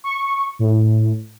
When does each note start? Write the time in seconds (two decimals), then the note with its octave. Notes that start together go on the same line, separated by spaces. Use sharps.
0.04 C#6
0.59 A2